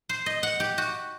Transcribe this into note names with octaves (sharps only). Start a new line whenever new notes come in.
C5
D#5
F#5
G4
F#4